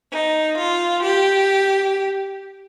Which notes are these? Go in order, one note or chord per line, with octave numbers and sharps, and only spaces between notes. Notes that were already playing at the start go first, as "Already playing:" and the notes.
D#4
F4
G4